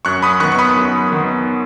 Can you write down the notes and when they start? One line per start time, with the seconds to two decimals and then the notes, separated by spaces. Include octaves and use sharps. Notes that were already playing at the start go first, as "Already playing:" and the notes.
0.05 F#2 C#6 F#6
0.22 B5 D#6
0.40 D#3 B3 C#6 F#6
0.52 C#6
0.59 B5 D#6
0.76 F#2
1.12 D#3 B3